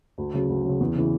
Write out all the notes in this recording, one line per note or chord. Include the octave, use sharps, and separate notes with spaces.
D2
C#3 F#3
D2
C#3 F#3
E2
C#3 E3